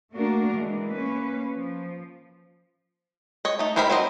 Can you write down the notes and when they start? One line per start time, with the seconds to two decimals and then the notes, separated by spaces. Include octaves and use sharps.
0.14 A3 A#3 D4 F#4 A#4
0.54 E3 G#3
0.91 A#3 C#4 B4
1.52 F3
3.45 C#5 D#5
3.59 A3 D#4
3.76 G3 G#3 A#4 C5 B5
3.90 F#3 C4 C5 D#5